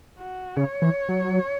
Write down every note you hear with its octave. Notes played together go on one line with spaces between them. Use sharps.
F#4
C#3 C#5
E3
F#3